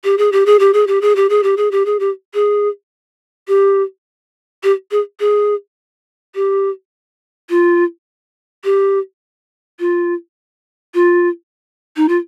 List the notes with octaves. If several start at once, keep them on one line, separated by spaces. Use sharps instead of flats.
G4
G#4
G4
G#4
G4
G#4
G4
G#4
G4
G#4
G4
G#4
G4
G#4
G4
G#4
G4
G4
G#4
G#4
G4
F4
G4
F4
F4
D#4
F4